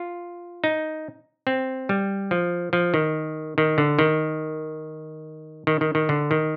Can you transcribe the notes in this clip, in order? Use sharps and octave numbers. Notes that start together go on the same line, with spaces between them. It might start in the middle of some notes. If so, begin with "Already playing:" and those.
Already playing: F4
D#4
C4
G3
F3
F3
D#3
D#3
D3
D#3
D#3
D#3
D#3
D3
D#3